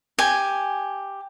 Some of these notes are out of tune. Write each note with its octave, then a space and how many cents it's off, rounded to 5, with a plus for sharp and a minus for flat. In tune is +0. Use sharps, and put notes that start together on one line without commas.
G4 +5 G#5 +0